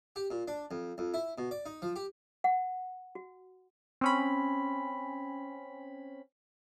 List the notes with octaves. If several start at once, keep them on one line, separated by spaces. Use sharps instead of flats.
G4
A#2
D4
F2
F2
E4
B2
D5
D#4
F3
G4
F#5
F#4
C4 C#4 B5